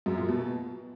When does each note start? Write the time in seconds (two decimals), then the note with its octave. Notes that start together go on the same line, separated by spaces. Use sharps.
0.06 F#2
0.17 A#2
0.28 B2